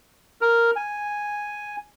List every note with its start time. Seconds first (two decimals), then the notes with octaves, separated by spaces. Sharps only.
0.41 A#4
0.76 G#5